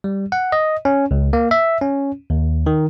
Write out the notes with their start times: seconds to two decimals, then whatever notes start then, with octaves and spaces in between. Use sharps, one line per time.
0.04 G3
0.32 F#5
0.52 D#5
0.85 C#4
1.11 C#2
1.33 A#3
1.51 E5
1.81 C#4
2.30 D#2
2.66 D#3